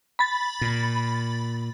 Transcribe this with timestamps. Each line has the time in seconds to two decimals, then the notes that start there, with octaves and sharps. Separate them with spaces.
0.19 B5 A6
0.61 A#2